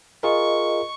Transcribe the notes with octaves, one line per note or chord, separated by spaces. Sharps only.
F4 G#4 A#4 D#5 C#6